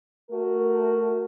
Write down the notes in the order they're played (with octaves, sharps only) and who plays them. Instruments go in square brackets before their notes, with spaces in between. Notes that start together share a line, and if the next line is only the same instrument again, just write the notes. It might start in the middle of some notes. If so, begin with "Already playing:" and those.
[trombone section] A3 F#4 A#4